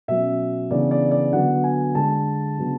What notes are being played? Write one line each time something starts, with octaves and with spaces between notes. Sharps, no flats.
B2 F#3 C#4 E5
C#3 E3 B3 D4 D5
D5
D5
D3 F#3 B3 F#5
G#5
D3 G#3 D4 A5
C#3 F#3 B3 D4